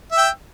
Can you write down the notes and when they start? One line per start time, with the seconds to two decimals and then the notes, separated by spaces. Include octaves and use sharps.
0.12 E5
0.15 E6
0.18 G5